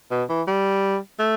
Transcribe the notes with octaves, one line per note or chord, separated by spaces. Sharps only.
B2
E3
G3
A3